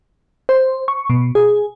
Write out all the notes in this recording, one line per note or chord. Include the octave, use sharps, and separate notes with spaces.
C5
C#6
B2
G#4